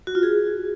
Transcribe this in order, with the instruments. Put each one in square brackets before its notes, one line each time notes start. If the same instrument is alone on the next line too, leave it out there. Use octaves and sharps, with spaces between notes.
[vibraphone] F#4
F4
G#4